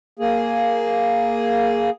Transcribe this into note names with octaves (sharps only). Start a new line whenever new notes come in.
A#3 G#4